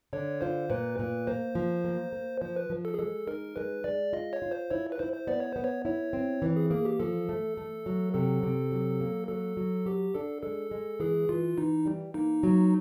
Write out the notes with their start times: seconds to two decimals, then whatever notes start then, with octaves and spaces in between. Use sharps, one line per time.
0.13 D3 C#5
0.41 F4 C5
0.70 A#2 B4
0.99 A#2 B4
1.27 A#3 C5
1.55 F3
1.84 A#3
2.12 A#3
2.41 F3 C5
2.56 B4
2.70 F3
2.85 A4
2.94 G#4
2.99 G#3 A4
3.27 D#4 A#4
3.56 G#3 B4
3.84 G#3 D5
4.13 F4 D#5
4.33 C#5
4.42 F4
4.51 C5
4.71 E4 C#5
4.92 B4
4.99 E4 C5
5.14 C5
5.27 B3 D5
5.40 C#5
5.53 B3 C5
5.64 C#5
5.85 E4 C#5
6.13 C4
6.42 E3
6.56 G#4
6.71 A#3 G#4
6.85 G4
7.00 F3 A4
7.29 A3
7.57 A3
7.86 F#3
8.14 C3 A4
8.43 C3
8.72 F#3
9.01 A#3
9.29 F#3 A4
9.57 F#3
9.86 F#4 G4
10.14 D4 A4
10.43 G#3 A4
10.71 G#3
11.00 E3 G#4
11.29 E3 F4
11.58 E3 D#4
11.86 G3
12.14 A#3 D#4
12.43 F#3